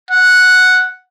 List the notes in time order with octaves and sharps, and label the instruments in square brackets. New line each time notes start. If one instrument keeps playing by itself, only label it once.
[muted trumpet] F#5